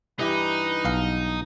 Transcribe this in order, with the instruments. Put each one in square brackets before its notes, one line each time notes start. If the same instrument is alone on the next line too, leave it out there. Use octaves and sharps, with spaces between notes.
[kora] G2 E3 G4 [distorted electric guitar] D#4 [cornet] B4
[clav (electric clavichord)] B1 F5